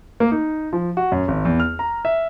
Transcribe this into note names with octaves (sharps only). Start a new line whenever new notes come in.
A#3
D#4
F3
F#4
F#2
G#1
E2
F6
A#5
E5